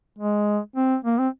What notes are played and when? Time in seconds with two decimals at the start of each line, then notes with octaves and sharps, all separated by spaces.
0.18 G#3
0.76 C4
1.05 A#3
1.18 C4